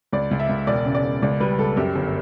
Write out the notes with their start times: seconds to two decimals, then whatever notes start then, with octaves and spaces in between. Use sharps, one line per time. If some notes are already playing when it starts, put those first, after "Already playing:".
0.12 C#2 D5
0.31 C#2
0.40 E5
0.49 C#2
0.67 E1 D5
0.86 C#3
0.95 D5
1.04 E1
1.22 C#2 D5
1.40 G3 B4
1.59 C#2 A4
1.77 F#2 G4
1.96 G1